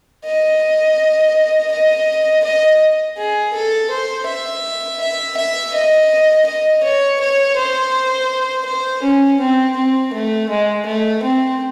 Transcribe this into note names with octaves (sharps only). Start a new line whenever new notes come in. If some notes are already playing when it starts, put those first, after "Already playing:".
D#5
D#5
D#5
G#4
A4
C5
E5
E5
E5
D#5
D#5
C#5
C#5
C5
C5
C#4
C4
C4
A3
G#3
A3
C4